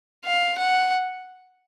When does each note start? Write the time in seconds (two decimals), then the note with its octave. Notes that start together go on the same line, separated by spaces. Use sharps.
0.25 F5
0.58 F#5